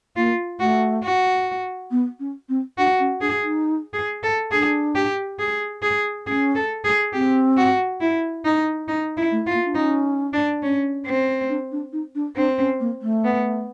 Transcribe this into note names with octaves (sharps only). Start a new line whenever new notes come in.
A#3 F4
A3 F#4
F#4
B3
C#4
C4
D4 F#4
C#4
D4 G#4
D#4
G#4
A4
D4 G#4
G4
G#4
G#4
C#4 G#4
A4
G#4
C4 G4
F#4
E4
D#4
D#4
E4
A3
F4
A#3
D4
C#4 D#4
D4
C#4
C4
D4
D4
D#4
D4
C4 D4
C#4
A#3
A3
B3